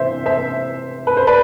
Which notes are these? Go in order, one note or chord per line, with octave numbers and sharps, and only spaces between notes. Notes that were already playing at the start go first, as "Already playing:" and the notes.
Already playing: C3 E3 C5 E5
C5 E5
B4
C5
B4 D5